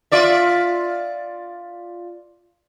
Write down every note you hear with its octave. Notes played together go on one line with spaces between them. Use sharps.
F4 D5 E5